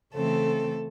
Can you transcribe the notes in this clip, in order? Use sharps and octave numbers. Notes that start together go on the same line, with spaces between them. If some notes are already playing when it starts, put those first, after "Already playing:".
C#3 E3 A3 C4 A4